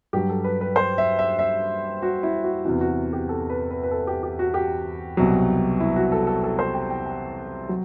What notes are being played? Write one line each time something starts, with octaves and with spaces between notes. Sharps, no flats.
G2 F#3 G4
A4
B4
B4
C5
E5
E5
E5
F#4
E4
F#4
E2 C3 E3 F#4
F#4
G4
A4
B4
B4
B4
A4
G4
G4
F#4
G4
C2 B2 F#3
E4
F#4
A4
A4
A4
C5
G5
G5
G5
F#3